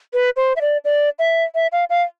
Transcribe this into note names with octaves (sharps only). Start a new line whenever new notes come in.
B4
C5
E5
D5
D5
E5
E5
F5
F5